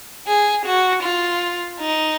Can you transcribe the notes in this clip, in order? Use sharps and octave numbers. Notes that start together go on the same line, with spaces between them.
G#4
F#4
F4
D#4